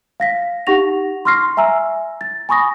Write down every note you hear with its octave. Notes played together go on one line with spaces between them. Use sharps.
F5 A#6 B6
D#4 G4 F#5 C#6 A#6 F7
C6 C#6 F6 A#6 C7
E5 G#5 A#5 E6
A6
G#5 B5 C#6 D#6 A#6